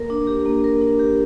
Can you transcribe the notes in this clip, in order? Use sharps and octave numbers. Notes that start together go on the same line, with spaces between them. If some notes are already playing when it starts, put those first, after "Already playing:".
Already playing: A#3 A#4
D4
G4
A#3
A#4
D4
G4